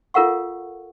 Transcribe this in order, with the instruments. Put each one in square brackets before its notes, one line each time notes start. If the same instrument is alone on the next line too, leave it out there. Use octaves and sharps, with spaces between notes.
[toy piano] F4 A4 A#4 F5 F#5 C#6